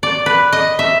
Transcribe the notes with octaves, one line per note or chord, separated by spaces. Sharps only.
D5
B4
D#5
E5